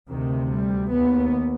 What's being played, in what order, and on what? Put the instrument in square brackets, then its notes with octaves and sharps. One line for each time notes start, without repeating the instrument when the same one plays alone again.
[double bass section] D2 C3 D#3
G3
D#2 B3